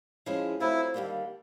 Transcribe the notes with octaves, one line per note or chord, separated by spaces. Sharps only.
F3 G#3 C#4 E4 G#4
F#3 A3 C4 E4 F4
D#2 D3 G3 A#3